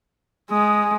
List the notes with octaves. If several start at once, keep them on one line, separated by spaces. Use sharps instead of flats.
G#3 D#6